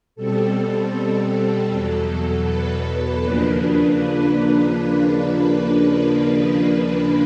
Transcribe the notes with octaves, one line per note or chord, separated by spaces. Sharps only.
B2 G3 C4 A4
E2 B2 F#3
B4
D#2 C#3 F3 A#3 D4 B4